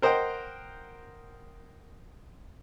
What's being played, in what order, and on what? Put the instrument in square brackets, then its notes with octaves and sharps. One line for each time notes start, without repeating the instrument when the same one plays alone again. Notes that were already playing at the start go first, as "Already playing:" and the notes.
[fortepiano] A#4 C5 D#5 F#5 G5